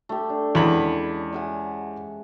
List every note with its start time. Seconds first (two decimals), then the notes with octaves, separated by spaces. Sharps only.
0.09 A3 G4
0.30 D4
0.55 E2 G#3 C#4 B5
1.32 E5 F#5 G#5